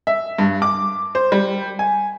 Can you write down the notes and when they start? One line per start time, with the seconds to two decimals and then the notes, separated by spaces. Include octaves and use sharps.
0.07 E5
0.39 G2
0.62 D6
1.15 C5
1.32 G3
1.79 G#5